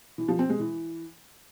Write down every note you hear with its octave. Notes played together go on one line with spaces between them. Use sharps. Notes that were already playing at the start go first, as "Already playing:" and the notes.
E3
F3
C4
G#3
E3